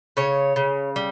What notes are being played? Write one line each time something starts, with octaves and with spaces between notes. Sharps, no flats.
C#3 C#5
C#3
G3